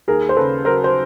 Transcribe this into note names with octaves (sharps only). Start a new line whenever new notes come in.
D#2 G#4 A#4
C5
C#3 A4 B4
F#3 A#4 C5
C5